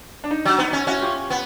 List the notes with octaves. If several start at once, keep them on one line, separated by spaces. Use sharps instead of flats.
D4
D#4
F#3 D4
B3 D#4
C#4
C#4 E4 F#4
F4 G4
B3